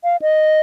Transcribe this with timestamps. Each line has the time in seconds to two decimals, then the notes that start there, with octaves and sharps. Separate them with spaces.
0.04 F5
0.22 D#5